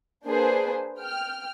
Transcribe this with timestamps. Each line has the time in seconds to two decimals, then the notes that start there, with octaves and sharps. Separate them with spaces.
0.26 A#3 D4 G#4 B4 C5
1.00 G5 F6